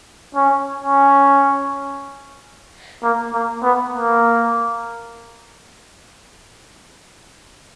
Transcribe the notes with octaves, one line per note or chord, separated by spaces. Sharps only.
C#4
C#4
A#3
A#3
B3
A#3